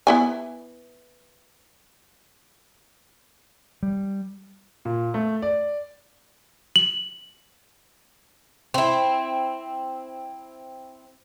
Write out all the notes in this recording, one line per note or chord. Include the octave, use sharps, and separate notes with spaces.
B3 E4 G#5
G3
A#2
A3
D5
F#7
C4 E4